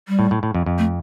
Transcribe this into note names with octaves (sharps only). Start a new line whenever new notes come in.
G3
A2
A2
A2
F2
F2
A3